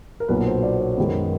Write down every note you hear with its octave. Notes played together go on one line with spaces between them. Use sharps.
A#4
B1 A#2 F#3 B3 B4
C5
D5
C#5
F#2 D#3 G#3 B3